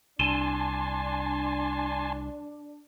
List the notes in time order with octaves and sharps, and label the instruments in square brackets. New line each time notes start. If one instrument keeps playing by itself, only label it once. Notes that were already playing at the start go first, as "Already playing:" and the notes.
[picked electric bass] C2 [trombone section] D4 [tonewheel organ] G#5 A5 C6